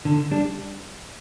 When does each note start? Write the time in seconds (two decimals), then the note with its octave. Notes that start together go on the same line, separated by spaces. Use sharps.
0.05 D3
0.32 G3 D4